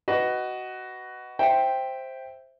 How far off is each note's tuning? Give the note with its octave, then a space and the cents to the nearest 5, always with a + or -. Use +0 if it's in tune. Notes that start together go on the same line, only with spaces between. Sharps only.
F#4 +15 B4 +10 D#5 +0
C5 +5 E5 +0 G5 +0